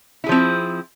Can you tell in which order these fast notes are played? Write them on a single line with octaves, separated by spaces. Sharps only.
E4 G#4 F3 C4